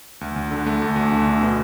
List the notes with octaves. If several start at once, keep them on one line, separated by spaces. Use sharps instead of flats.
D2
D2
D3
A3
D2
D2
D3
D3
B2